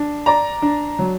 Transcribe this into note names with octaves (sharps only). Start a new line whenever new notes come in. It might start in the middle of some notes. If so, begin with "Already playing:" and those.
Already playing: D4
D5 A#5
D4
F#3